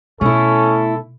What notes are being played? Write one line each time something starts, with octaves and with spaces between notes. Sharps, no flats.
B2 A3 C#4 E4 A4